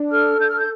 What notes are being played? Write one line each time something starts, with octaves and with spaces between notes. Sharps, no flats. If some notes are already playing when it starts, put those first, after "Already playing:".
Already playing: D4
A4 F6
D4 G6
F6
G6